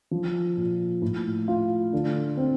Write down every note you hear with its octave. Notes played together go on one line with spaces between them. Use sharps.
F3
A#2
A2
F4
D3
C4